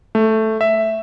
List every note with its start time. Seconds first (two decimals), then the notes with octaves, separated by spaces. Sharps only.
0.15 A3
0.61 E5